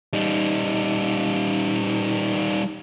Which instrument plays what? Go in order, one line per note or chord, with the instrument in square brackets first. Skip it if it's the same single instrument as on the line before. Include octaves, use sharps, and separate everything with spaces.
[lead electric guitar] G3 D#4